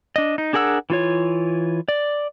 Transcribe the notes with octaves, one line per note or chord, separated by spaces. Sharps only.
D4 D#5
D#4
D4 G#4 A#4 F#5 E6
E3 F4 C#5
D5